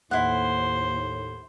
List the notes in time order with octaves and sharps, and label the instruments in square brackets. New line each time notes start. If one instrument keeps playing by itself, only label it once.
[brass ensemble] D#2 A2 [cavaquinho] E4 F#5 [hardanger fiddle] C5